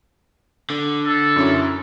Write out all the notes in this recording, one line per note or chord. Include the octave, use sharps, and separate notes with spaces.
D3
A4
F#2 C#4 E4